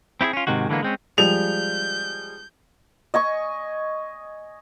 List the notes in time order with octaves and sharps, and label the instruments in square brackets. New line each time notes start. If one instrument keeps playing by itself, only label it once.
[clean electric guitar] C4 E4 G4 G#4
C#4 F4
G#2 C3 D#3 G#3 F#4
D3 E3 G#3 A#3 B3
G#3 C4 C#4
[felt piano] F3 G3 G#3 [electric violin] G6 [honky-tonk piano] F7
[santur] D#5 G#5 C#6